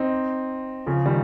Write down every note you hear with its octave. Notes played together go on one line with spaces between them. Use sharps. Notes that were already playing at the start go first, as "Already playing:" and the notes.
Already playing: C4 D#4
C#3 F3
D#3 G3